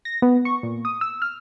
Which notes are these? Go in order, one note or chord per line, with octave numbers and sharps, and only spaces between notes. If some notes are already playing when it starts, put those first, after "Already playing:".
A#6
B3
C#6
A#2
D#6
E6
F6